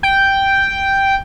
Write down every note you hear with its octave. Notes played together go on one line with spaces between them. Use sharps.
G5